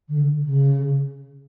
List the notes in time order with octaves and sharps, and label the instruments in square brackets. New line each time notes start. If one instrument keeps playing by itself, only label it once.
[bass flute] D3
C#3